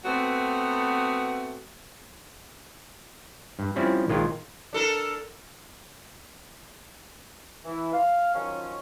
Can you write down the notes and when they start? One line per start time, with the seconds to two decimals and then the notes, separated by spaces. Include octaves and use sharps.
0.05 A3 B3 C4 F#4
3.59 G2
3.76 F3 G3 C4 C#4 E4
4.08 A#1 A#2 D#3 G#3 F4 G5
4.73 D4 A4 A#4
7.65 E3
7.93 F5
8.34 D#3 F3 F#3 C#4